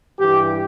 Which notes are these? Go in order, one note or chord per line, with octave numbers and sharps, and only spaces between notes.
G2 E3 G4